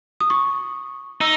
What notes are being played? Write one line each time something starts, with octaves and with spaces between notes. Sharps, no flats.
D#6
C#6
D#4 E6